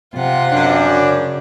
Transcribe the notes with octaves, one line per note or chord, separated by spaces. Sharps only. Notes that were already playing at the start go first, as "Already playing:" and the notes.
C3 F4 F#5
F#2 D4
C#3